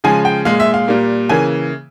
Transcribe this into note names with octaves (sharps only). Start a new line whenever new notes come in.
C#3 F3 G#3 G#5
G5
A#2 G#3 F5
E5
F5
A#2 G3 A#3
C#3 E3 A#3 G#5